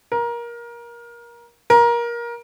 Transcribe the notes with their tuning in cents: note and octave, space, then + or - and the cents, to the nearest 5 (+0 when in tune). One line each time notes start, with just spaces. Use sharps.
A#4 +20
A#4 +20